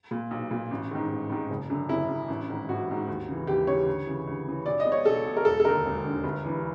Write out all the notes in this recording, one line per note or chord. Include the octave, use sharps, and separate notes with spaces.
A#2
B1
A#2
A1
G#2 D#3
A1
G#2 D#3
F#1
F#2 D3
F#1 E4
F#2 D3
A1
G#2 D#3
A1 F#4
G#2 D#3
D#2
C#3 E3
D#2 G4
C#3 E3 C#5
D2
C#3 E3
D2
C#3 E3
B1 D5
D#5
B2
C#5
B1 A4
B2
A#4
E1 A4
A4
D#2 D3 A#4
E1
D#2 D3
G1
G2 E3